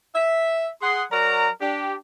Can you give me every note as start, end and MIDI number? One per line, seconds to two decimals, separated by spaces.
0.15 0.68 76
0.82 1.04 68
0.82 1.04 78
0.82 1.04 84
1.11 1.49 54
1.11 1.49 66
1.11 1.49 70
1.11 1.49 74
1.11 1.49 82
1.61 1.94 62
1.61 1.94 67